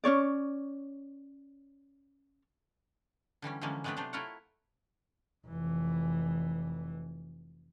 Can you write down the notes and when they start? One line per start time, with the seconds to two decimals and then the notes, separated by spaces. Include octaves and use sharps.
0.04 C#4 D4 C#5 D5
3.42 D3 E3 G3 C#4
3.61 D3 E3 F3 G#3 A#3 C#4
3.84 G#3 A3 B3 C4 D4 B4
3.97 C3 F#3 A3 D4 C5
4.13 A3 E4 F4 A#4 C#5 F#5
5.46 F1 E3